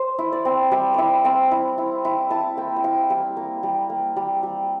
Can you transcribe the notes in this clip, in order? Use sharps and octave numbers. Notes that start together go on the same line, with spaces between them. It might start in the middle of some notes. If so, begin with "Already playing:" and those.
Already playing: C5
E4
D5
C4
G3 E5
E4 D5 E5
C4 F5
E4
E4
E4
E4 A5
A#3 G5
G5
E4 F5
G3 F5
A#3
G3
A#3
G3
G3